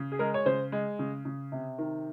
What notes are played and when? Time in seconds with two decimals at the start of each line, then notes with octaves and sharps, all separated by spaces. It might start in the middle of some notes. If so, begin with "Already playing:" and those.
Already playing: C#3
0.12 G#4
0.19 G#3 A#4
0.34 C#5
0.46 C#3 C5
0.72 G#3
0.99 C#3
1.25 C#3
1.52 C3
1.78 D#3